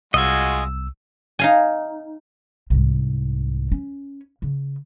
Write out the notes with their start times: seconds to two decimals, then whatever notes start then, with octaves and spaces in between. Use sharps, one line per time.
0.14 C2 G#3 F4 F#4 D#5 G#5 E6
1.39 D#4 F5 G#5
2.70 C2 G#2
3.72 C#4
4.42 C#3